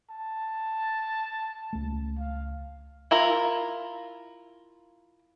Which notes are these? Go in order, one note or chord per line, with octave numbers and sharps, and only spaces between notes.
A5
C#2 A3
F5
E4 F4 A#4